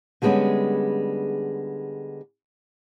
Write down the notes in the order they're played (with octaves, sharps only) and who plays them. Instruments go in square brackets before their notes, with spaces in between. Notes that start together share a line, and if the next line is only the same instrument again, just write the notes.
[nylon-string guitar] D3 G3 G#3 B3 C#4 G#4